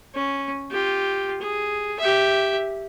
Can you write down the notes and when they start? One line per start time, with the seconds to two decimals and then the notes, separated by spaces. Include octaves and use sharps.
0.15 C#4
0.71 F4 G4
1.41 G#4
2.00 G4 E5